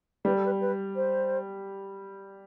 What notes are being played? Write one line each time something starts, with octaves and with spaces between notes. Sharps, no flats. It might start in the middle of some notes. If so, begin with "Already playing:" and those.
G3 B4
A4
B4
B4
C5